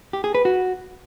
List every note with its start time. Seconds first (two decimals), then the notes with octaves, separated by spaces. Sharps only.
0.13 G4
0.24 G#4
0.35 B4
0.45 F#4